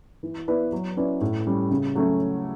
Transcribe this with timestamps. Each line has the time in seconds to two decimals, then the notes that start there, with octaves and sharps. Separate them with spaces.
0.23 E3
0.48 B3 E4 B4 D5
0.72 F#3
0.97 C#4 E4 B4 D5
1.21 A2
1.46 G3 C#4
1.71 C#3
1.95 F#3 A3 C#4